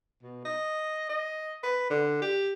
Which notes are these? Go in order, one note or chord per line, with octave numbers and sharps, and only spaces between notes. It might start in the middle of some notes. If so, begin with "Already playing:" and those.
B2
D#5
D#5
B4
D3
G4